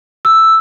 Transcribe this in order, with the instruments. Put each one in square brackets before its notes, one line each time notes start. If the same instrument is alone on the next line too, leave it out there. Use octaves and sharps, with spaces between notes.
[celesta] E6